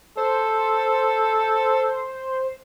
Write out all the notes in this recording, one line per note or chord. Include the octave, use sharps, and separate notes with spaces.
A4 C5